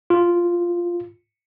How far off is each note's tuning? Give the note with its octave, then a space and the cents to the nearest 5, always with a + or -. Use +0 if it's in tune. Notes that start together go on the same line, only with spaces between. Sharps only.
F4 -5